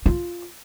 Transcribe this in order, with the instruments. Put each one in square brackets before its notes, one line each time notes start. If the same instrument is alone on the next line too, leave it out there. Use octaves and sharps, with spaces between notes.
[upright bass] F4